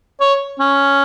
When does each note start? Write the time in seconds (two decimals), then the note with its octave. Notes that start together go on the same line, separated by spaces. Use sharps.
0.20 C#5
0.59 C#4